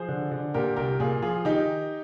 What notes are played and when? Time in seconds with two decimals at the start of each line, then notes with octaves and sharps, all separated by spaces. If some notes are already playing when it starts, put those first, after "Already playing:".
Already playing: F3 G#4 C5
0.08 D3
0.31 D3
0.54 A#2 G4 A#4
0.76 C2 G4 A#4
1.00 A#2 F4 G#4
1.22 F3 F4 G#4
1.45 D#3 D#4 G4